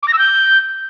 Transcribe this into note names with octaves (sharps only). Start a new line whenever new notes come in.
D6
A#6
E6
G6